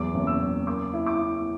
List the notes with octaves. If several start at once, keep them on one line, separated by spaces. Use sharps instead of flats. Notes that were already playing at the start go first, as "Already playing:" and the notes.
Already playing: E2 F#3 D6
F#1
E6
F#1
A#3 D6
E4
D6
E4